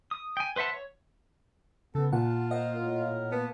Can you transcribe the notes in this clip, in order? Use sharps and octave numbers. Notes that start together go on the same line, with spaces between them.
D#6
G5 G#5
B4 C5 E5 F#5 A5
C#5
C#3 B3 A4
A#2 F4 F#5 A5
A#4 C5 D#5 F5 F#5
A2 A#4
A#3 B3 A5